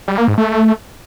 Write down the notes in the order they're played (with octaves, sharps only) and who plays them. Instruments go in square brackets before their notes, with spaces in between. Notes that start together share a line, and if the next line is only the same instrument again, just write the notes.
[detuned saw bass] G3
A#3
G#2
A3